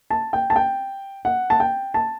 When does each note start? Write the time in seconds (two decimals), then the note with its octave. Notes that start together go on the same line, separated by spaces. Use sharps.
0.10 A5
0.33 G5
0.50 A5
0.56 G5
1.25 F#5
1.50 A5
1.60 G5
1.94 A5